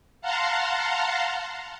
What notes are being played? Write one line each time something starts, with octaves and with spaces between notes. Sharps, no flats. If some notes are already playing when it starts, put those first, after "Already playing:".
F5 F#5 A5 A#5 C6